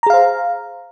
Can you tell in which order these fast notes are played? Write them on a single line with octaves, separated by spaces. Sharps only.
A#5 G#4 F5 C5